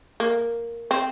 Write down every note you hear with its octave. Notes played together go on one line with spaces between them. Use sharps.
A#3
C4